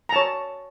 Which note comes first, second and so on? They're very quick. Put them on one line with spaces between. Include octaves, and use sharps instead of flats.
A#5 A5 C#5